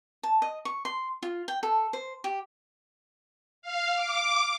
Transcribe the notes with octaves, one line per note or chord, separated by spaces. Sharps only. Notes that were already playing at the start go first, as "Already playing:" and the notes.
A5
D#5
C#6
C6
F4
G5
A4
C5
G4
F5
D6